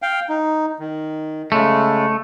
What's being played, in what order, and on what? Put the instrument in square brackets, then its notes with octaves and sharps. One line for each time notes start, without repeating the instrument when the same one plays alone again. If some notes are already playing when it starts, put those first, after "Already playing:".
[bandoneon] F5 G5
D#4
D#3
[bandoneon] C#3 G#3 [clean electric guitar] A3